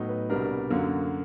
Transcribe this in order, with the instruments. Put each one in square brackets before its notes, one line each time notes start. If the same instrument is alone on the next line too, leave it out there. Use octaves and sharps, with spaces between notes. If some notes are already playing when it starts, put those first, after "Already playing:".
Already playing: [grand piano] A2 F#3 B3 D#4
B4
C2 B2 G3 B3 D4 A#4
F#2 D3 F#3 A#3